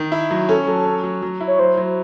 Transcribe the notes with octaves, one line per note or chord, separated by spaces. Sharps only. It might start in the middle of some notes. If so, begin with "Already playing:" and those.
Already playing: D#3
E4
F#3
C#4 A4
F#3 A4
C#4
F#3
F#3
E4
C#5
F#3 C5
F#3